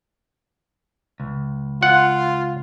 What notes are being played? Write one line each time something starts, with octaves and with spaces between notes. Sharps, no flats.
C#2
F4 F#5